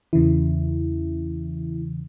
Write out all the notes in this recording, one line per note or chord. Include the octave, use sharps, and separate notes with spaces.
E2 C#3 E3 E4